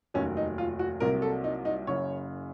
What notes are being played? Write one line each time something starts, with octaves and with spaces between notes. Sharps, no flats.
F1 D#2 D#3 F#3 C#4
D#4
F4
F#4
C2 C3 F#3 A#3 A#4
A4
D#4
D#4
F#1 F#2 C#3 C#5